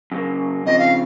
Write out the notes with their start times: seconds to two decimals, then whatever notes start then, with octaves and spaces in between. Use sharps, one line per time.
0.12 F#2 C#3 F#3 A#3
0.65 C#3 F3 C4 D#5
0.79 F5